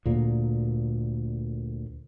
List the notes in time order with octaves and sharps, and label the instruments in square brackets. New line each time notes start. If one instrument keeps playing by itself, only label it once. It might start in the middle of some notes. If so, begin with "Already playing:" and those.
[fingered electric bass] D2 A#2 A#3